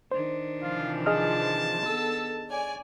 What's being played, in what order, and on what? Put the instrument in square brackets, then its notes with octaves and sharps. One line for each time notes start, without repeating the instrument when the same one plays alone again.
[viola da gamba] D#3 D4 [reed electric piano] C5
[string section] C3 E3 F3 [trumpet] F4
[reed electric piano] G#4 D#5 F6 [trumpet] A5
[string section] B3 A4 E6
C#5 D5 G#5